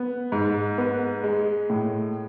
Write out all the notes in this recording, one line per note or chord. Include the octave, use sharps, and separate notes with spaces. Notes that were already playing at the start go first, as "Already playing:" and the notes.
Already playing: B3
G#2
B3
G#3
A2